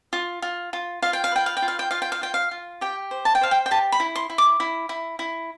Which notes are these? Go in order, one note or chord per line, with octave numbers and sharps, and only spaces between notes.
F4
F4
F4
F4 F5
G5
F5
B4 G5
F5
G5
F4
F5
G5
F4 F5
G5
F5
F4 G5
F5
F4
G4 G5
C5
A5
G5
C5 F5
G5
G5
G4 A5
B5
E4
C6
E4
D6
E4
E4
E4